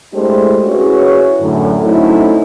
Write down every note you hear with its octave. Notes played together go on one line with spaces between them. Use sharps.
G#3 A3 D4 E4 G4 C5
C#4 E4 F#4 G#4 B4 C#5
F#2 A2 D3
F#3 A3 C4 C#4 D#4 E4